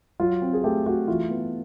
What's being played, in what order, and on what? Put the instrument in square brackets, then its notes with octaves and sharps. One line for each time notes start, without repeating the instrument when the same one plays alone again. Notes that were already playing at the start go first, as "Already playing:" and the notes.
[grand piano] F#3 F4
C4
G#4
A3 G4
A3 F#4
E3 F4
B3